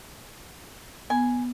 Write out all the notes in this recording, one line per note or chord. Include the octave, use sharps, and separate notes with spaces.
B3 G#5